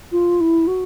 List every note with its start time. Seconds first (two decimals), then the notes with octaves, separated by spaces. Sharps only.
0.12 F4
0.41 E4
0.67 F#4